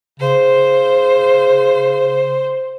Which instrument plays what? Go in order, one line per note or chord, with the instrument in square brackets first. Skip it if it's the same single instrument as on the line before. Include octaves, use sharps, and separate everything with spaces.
[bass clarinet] C#3 [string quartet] C5